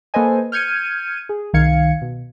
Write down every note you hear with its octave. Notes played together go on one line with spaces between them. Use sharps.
A#3 A4 B4 C5 D#5 G#5
F6 G6 G#6 C#7 D#7
G#4
C2 D#3 F5 G#6 C#7
B2